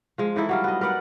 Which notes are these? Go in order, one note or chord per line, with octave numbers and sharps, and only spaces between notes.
F3 G#3
E3 D#4 E4 A4
F#3 G3 F4
B3 D#5
A#4 B4 D5 F#5